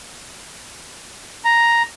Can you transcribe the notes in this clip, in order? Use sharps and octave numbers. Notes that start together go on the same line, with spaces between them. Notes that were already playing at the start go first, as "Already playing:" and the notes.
A#5